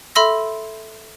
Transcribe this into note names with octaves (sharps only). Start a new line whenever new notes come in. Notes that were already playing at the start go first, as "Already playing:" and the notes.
A4 E5 B5 C6 E6 A#6